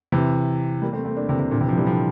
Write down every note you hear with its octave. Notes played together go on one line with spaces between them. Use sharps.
C3 E3
G3 A#3
A3 C4
A3 C4
A#3 D4
C3 E3
C3
A#2 D3
C3 E3
D3 F3
E3 G3
D3 F3